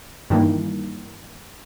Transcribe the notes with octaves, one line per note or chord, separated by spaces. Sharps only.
G2 D#3 E3 A#3